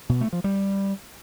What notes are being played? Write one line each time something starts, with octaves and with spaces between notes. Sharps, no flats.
B2
A3
F3
G3